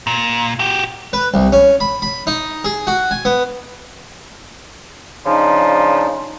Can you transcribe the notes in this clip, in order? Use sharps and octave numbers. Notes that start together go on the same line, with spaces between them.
A#2
F#4 G4
B4
C2
C#4
B5
B5
D#4
G#4
F#4
G#5
B3
C#3 F3 D4 D#4